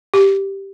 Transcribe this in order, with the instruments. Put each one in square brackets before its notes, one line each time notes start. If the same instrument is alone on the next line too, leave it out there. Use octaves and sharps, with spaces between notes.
[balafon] G4